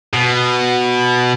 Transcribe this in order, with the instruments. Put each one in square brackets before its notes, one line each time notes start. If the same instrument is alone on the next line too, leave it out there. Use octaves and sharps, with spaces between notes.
[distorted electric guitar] B2